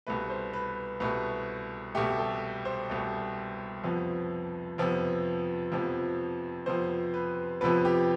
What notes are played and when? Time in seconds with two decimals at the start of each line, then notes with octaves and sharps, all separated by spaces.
0.07 C2 B2 A3 B4
0.30 C5
0.53 B4
1.00 C2 B2 A3 B4
1.95 C2 B2 A3 G4
2.18 A4
2.65 C5
2.90 C2 B2 A3
3.84 F2 C3 F3 B3
4.78 F2 C3 F3 B3
5.72 F2 C3 F3 B3
6.66 F2 C3 F3 B3 C5
7.14 B4
7.61 F2 C3 F3 B3 B4
7.85 G4